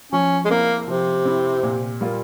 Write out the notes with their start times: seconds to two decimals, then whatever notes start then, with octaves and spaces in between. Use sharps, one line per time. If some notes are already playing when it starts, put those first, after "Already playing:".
0.12 F3 C#4
0.45 G#3
0.50 A#3 C4 E4
0.88 C3 F3
1.25 C4 E4
1.63 A#2
2.01 G3 A#3 F4